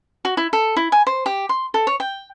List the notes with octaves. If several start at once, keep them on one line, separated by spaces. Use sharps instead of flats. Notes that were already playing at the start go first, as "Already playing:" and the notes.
F#4
E4
A4
E4
G#5
C5
G4
C6
A4
C#5
G5